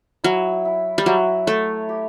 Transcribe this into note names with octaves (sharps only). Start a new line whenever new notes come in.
F#3 E4
E4
G3
F#3 E4
A3 C#5
G4